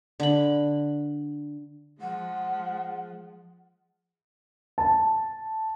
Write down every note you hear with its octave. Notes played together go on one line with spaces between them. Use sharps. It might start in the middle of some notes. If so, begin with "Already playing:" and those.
D3 B5
F3 G#3 F#5
A5